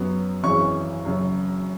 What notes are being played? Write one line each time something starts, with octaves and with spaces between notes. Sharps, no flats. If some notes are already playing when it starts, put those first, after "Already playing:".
Already playing: F#2 F#3 B3
G#1 F#2 E3 G#3 C#4 C#6
F#1 F#2 F#3